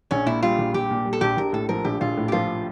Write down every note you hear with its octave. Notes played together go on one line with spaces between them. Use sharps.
A#1 C#4
A#2 E4
G3 F4
A#1
A#1 G4
A#2
G3
A4
A#1 G4
A#1 A#4
A2 A4
F3 A#4
A#1 G4
A#1 F4
A2
G4
F3 F4